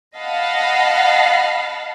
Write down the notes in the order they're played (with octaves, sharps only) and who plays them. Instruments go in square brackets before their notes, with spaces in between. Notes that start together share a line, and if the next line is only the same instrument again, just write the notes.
[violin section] D#5 F5 F#5 A5 B5